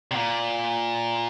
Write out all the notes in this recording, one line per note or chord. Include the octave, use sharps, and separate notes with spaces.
C3
A#2